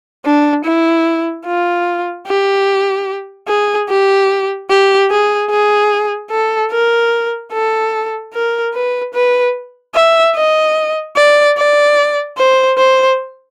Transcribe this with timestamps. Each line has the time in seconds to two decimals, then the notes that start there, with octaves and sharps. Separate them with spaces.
0.25 D4
0.65 E4
1.46 F4
2.27 G4
3.48 G#4
3.89 G4
4.70 G4
5.10 G#4
5.51 G#4
6.31 A4
6.71 A#4
7.52 A4
8.33 A#4
8.74 B4
9.14 B4
9.95 E5
10.35 D#5
11.16 D5
11.57 D5
12.38 C5
12.78 C5